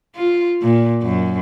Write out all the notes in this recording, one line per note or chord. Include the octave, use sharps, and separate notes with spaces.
F4
A#2
F#2